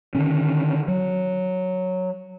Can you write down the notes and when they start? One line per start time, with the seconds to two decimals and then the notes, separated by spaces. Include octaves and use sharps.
0.15 D3 D#3 C#4
0.88 F#3